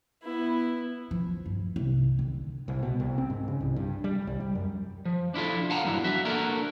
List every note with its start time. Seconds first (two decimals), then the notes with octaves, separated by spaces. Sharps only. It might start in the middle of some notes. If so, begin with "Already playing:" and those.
0.23 B3 E4
1.11 F3
1.46 G2
1.76 C2
2.19 D3
2.68 C2
2.83 B2
3.00 C2
3.18 C4
3.30 G#2
3.48 C#3
3.60 C2
3.76 G2
4.04 G3
4.27 C2
4.40 G3
4.55 F#2
5.05 F3
5.34 D4 E4 F4 A4
5.70 F5 F#5 A5 A#5
5.83 E2 G2 F#3 D4 E4
6.04 F#4 E5
6.25 A#3 D4 F#4 A4 A#4